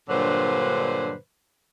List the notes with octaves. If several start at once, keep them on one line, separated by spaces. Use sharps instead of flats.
G2 A#2 D3 F#3 B4 C5